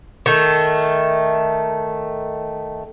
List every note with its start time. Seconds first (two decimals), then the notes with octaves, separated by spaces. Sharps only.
0.26 D#3 A3